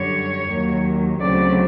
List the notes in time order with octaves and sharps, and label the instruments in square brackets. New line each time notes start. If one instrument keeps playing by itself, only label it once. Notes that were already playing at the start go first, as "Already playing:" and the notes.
Already playing: [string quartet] F#2 D3 G3 C#5
D#2 D#3 F#3 A#3
D2 C#3 F#3 A3 C4 D5